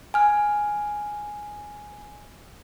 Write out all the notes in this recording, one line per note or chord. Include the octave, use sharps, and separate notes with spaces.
G#5 F6